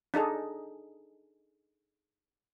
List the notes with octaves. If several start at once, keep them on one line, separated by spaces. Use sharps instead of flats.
D4 D#4 G#4 A4